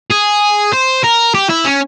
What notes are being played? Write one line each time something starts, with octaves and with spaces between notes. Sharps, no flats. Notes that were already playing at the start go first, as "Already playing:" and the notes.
G#4
C5
A#4
G4
E4
C#4